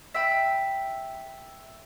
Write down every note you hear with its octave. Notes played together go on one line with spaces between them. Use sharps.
E5 G5 B5